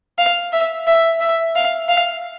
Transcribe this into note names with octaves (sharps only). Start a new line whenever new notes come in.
F5
E5
E5
E5
F5
F5